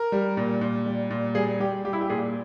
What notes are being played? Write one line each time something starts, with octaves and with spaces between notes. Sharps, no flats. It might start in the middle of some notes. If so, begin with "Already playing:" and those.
Already playing: A#4
G3
A#2
A#2
G3
A#2
G3 G#4
G3 G4
G3 G4
E4
G4
A#2 G#4